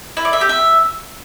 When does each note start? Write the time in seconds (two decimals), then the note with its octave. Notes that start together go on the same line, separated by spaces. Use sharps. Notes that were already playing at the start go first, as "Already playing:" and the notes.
0.17 E4
0.25 D5
0.33 E5
0.41 G4
0.49 E5